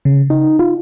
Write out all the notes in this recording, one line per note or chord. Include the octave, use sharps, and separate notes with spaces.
C#3
D#4
F4